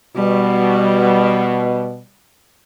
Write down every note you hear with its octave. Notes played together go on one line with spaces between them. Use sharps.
B2 G3